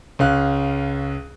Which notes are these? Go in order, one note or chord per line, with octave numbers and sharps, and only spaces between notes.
C#2 C#4 F5 F#6